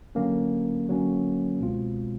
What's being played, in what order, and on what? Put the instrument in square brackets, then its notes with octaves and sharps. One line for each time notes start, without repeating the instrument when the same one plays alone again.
[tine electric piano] D3 F#3 A#3 C#4
D3 F#3 A#3 C#4
C#2 B2 G#3 C4 F4